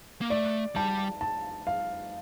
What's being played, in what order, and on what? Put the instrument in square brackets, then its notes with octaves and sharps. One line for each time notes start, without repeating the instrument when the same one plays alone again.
[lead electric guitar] A#3
[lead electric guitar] A3 [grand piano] D5
[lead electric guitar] G3 [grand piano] A5
[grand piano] A5
F5